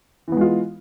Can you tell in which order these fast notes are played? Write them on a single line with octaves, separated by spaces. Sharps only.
E3 B3 G#3 F4